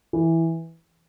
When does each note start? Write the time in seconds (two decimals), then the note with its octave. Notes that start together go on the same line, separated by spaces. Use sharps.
0.13 E3